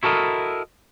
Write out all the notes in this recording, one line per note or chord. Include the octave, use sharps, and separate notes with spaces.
E4 F#4 A4 A#4 D#5